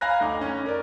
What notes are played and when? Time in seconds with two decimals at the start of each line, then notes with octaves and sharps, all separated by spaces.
0.01 F5 G#5 A#5 B5 F#6 A#6
0.20 D2 D#4 D6
0.41 C#4
0.66 A#4 D5